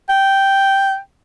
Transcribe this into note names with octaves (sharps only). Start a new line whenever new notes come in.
G5